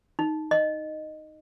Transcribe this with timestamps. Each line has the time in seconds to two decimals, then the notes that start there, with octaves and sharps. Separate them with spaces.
0.19 D#4
0.51 D#5